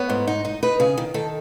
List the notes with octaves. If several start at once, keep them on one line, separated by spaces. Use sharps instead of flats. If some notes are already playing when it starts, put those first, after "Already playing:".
Already playing: B3 C#5
G#2
D#4
D#4
D#4 B4
C#3 G#4
D#3
D#3 A4